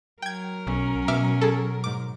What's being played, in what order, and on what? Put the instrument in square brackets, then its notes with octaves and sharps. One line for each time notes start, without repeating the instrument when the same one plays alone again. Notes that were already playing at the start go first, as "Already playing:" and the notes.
[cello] F#3 A#4 [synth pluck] G5 G#6
[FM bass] B1 [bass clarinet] C#4
[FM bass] B2 [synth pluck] E5 D6 F6
[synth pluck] G#4 A4
G#2 D6